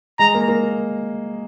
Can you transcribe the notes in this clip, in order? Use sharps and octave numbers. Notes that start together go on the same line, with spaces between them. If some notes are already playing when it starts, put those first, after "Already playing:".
G#3 A#5
A#3
A#3